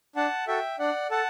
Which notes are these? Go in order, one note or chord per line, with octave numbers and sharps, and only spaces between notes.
D4 F#5 A5
F#4 A4 E5 G5
D4 D5 F#5
A4 F#5 A5